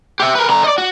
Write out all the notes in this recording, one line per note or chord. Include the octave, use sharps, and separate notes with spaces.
G4 E5
A#4 B4
D3 A#5
D5 D#5
F#4